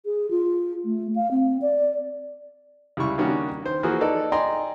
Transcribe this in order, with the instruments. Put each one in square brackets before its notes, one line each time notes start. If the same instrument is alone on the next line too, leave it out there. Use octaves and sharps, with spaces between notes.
[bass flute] G#4
F4
A3
F5
C4
D5
[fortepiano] C#2 G3 E4 C#6
D#3 G3 A#3 C#4 D4 F#4
D#3 C5
E3 F3 A#3 F#4 G#4
D#4 A4 B4 D5
D5 D#5 G5 G#5 A#5 C6